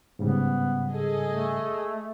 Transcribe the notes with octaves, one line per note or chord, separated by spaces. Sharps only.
G#2 C#3 G3 B3
G#4 A4 D#5
A3